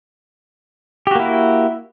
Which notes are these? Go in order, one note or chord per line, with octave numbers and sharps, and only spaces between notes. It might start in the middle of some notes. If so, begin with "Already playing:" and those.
A#3 E4 F#4 G4